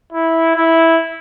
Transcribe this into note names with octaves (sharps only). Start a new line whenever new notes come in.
E4
E4